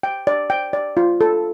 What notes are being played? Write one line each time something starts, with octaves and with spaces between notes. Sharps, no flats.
G5
D5
G5
D5
F4
A4